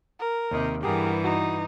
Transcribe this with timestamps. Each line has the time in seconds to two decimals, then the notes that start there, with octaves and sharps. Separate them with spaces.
0.19 A#4
0.51 D#2 C3 D#3
0.83 G2 E3 B3 G4 G#4 A#4
1.24 D#4 F#4